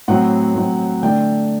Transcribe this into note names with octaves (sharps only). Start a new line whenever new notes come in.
A2 F#3 C4 F#5
A2 F#3 C4
D3 A3 D4 G5